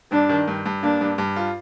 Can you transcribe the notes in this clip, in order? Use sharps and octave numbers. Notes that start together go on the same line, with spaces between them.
G2 D4
D#3
G2
G2
A#3 D4
G2
G2
F4